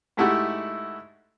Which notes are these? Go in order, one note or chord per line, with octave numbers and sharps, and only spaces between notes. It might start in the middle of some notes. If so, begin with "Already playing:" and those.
G#2 A3 E4 F#4 G4